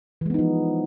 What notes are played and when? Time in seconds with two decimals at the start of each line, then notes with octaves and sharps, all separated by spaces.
0.21 E3
0.26 G#3
0.30 B3
0.34 D#4
0.39 F3